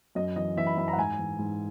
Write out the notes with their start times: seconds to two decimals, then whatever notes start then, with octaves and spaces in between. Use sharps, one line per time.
0.15 F#2 D#5
0.36 E3 D#5
0.57 E3 E5
0.67 B5
0.77 F#2 B5
0.88 A#5
0.93 F#5
0.97 G#2 G#5
1.19 E3
1.39 G#2